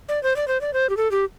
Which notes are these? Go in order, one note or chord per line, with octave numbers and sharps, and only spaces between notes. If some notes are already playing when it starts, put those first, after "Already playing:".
D5
C5
D5
C5
D5
C5
G4
A4
G4